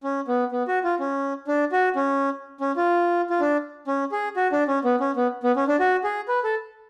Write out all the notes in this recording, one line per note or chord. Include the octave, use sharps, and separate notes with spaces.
C#4
B3
B3
F#4
F4
C#4
D4
F#4
C#4
C#4
F4
F4
D4
C#4
G#4
F#4
D4
C#4
B3
C#4
B3
B3
C#4
D4
F#4
G#4
B4
A4